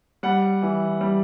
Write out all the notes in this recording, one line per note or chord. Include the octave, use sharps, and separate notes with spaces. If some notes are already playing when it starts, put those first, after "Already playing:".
G3 F#5
E3
G3